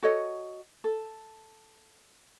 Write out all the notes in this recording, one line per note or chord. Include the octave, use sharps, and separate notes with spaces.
F#4 A4 C#5 D#5
A4